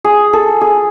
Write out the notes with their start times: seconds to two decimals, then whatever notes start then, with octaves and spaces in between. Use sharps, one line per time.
0.04 G#4
0.33 A4
0.61 G#4